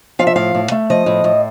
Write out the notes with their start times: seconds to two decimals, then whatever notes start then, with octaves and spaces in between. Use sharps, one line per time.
0.19 F3 F5
0.27 E5
0.36 A2 F5
0.55 A2
0.71 A3
0.90 F3 D#5
1.06 A2
1.24 A2